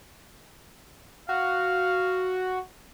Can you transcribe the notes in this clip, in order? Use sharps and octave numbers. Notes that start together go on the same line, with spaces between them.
F#4 F5